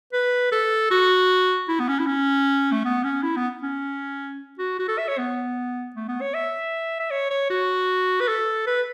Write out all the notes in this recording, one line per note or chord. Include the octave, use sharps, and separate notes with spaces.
B4
A4
F#4
E4
B3
C#4
E4
C#4
A3
B3
C#4
E4
B3
C#4
F#4
F#4
A4
E5
C#5
B3
A3
B3
C#5
E5
E5
C#5
C#5
F#4
B4
A4
B4